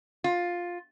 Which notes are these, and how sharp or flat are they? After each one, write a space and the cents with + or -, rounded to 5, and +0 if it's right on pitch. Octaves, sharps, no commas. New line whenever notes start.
F4 +10